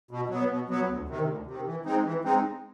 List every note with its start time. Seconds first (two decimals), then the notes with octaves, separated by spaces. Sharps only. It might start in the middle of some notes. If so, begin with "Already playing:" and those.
0.11 B2
0.30 F#3 B3
0.50 B2
0.69 F#3 B3
0.89 D2
1.08 C3 D#3
1.27 D2
1.46 C3 D#3
1.66 E3
1.85 G#3 C4 D#4
2.04 E3
2.25 G#3 C4 D#4